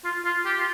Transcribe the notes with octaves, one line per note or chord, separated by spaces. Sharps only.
F4
F4
G4
F4